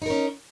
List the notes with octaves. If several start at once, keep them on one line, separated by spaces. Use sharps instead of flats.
C#4 D#4 A#4